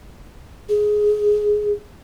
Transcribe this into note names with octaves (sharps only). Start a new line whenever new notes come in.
G#4